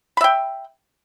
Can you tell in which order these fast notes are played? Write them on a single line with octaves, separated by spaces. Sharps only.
B5 E5 G5